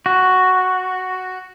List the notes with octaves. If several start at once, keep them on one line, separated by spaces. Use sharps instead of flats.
F#4